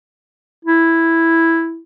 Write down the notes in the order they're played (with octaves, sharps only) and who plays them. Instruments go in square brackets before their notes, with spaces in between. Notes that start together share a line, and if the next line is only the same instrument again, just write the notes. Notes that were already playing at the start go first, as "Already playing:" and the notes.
[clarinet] E4